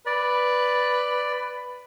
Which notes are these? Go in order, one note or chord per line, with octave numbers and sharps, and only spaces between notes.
B4 D5